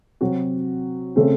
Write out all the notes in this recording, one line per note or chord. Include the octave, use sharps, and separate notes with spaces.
C3 F#3 C4 F#4
C#3 A3 C4